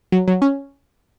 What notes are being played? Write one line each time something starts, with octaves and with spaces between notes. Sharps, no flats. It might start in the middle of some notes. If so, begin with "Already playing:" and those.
F#3
F#3
C#4